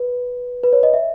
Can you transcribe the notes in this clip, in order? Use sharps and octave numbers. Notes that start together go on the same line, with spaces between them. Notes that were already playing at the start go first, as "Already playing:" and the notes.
Already playing: B4
B4
C#5
D#5
E5